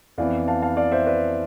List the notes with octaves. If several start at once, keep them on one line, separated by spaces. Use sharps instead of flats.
F2 E3 B3 D5 F5
F5 A5
F5 A5
D5 F5
C5 E5
B4 D5